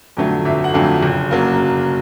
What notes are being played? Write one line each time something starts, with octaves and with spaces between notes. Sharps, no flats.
F2 D3 F#3 A3
G1 E5
F#5
F2 D3 F#3 A3 F5
F#1
C#3 F#3 A#3